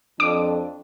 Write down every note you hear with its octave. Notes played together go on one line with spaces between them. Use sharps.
F2 D4 D6